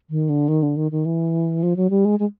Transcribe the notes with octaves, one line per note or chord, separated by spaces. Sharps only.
D#3
D3
D#3
D3
D#3
D#3
E3
F3
F#3
G3
G#3
G#3